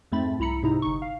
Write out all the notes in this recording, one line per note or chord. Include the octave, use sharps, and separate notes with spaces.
F2 G#2 A3 C4 B5 A6
C2 E4 A#5 B5 C#7
G#2 C3 D#4 E4 A#5
G1 D#4 C#6
F5